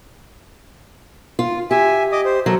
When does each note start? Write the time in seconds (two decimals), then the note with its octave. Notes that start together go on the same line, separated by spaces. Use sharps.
1.39 F4
1.71 G4 E5 G#5
2.12 D#5 D6 D#6
2.25 C5
2.46 F#3 A4 A#4